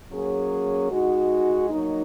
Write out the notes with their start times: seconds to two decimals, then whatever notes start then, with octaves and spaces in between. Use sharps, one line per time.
0.11 F#3 A#3 C#4 G#4
0.90 G#3 D#4 F#4
1.69 F#3 A#3 D#4